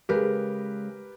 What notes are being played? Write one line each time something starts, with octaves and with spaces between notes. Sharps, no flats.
C#3 G#3 G4 A#4 B4